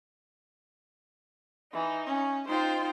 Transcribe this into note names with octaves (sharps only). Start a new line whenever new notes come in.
E3 D#4
C#4
D#4 F4 C5 G5